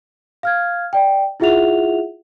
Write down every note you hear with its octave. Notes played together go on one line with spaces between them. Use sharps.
F5 F6 G#6
D5 G5
E4 F4 G#4 E5 F#5 F7